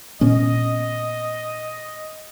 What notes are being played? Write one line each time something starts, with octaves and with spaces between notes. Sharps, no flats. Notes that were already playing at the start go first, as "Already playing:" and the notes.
A#2 B3 C#4 D#5